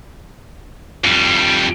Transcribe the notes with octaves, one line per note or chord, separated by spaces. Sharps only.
F2 G3